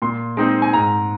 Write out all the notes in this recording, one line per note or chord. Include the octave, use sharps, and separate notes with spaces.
A#2 C6
G#3 C4 D#4
G#5
G#2 A#5